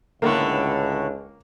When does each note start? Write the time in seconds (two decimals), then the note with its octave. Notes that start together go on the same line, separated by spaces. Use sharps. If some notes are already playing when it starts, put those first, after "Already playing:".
0.22 C#2 A2 D3 A#3 B4 C#6